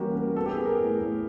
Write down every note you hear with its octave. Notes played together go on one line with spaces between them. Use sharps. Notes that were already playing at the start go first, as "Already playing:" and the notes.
Already playing: E3 G3 A#3 C#4 F#4 G4
A#3
B3 A4
G4
G#4
B3
A#4
A2
A2